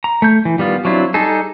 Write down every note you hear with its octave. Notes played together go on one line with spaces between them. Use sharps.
A#5
A3 G6
E3
D#3 G3 B3 F4
F#3 C4 D4 E4 F4
G3 D#4 G#4 A4